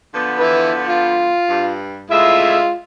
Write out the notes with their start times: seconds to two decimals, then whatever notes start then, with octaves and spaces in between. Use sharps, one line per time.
0.15 D3 F3 B3
0.39 E4 B4
0.88 F4
1.48 G2
2.10 A2 G#3 F4 E5